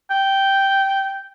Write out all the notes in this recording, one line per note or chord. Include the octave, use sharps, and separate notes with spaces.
G5